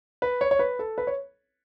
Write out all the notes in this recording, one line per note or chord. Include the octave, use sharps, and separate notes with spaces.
B4
C#5
C#5
B4
A4
B4
C#5